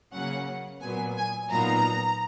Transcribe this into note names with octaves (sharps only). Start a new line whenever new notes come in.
C#3 F#3 A#3 C#4 F#5
A#2 F#3 B3 G#5
G#5
A#2 F#3 B3 D#4 A#5